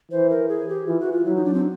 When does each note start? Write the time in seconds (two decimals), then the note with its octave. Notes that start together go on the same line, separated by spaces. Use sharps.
0.11 E3 C5
0.29 A#4
0.48 G#4
0.69 G4
0.87 E3 F4
1.00 F#4
1.12 F4
1.25 F#3 E4
1.36 D#4
1.45 D4
1.54 C4